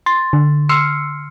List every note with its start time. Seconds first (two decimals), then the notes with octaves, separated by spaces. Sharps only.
0.06 C6 A6
0.33 D3
0.69 C6 E6 F6 C7 C#7